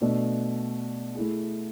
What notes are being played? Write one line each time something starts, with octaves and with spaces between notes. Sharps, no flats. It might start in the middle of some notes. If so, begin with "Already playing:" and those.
B2 A3 D4
A3 E4 G#4